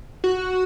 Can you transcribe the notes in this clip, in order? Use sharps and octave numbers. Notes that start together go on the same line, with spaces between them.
F#4